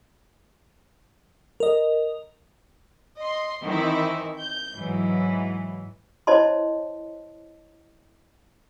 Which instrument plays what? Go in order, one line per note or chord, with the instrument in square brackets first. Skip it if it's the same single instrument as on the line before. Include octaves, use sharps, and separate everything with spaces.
[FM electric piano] A#4 D#5
[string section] D#5 C6
D#3 E3 C4 D#4 E4
G6
G#2 E3 F#3
[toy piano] E4 C5 C#5 D#5 A5 C6